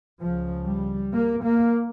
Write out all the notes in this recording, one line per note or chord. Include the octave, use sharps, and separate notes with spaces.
C#2 C#3 F3
G3
A#3
A#3